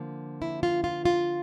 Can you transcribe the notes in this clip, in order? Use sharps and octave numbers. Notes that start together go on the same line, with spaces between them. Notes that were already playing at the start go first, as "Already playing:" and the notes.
Already playing: D3 F3 A#3
E4
F4
F4
F4